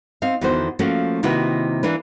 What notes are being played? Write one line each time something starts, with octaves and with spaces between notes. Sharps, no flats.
C4 D#4 F5
E2 D3 D#3 B3 F#4 C5
F3 A3 A#3 C#4 F#4
C3 D#3 A#3 E4 F#4 B4
E3 A#3 D4 B4